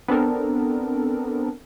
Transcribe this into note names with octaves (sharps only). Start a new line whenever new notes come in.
B3 C4 D4 A4 A#4